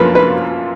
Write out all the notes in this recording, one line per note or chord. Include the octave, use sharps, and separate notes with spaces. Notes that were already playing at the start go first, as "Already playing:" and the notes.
Already playing: F#2 F3 A#3 C#4 F4 A#4 B4
B4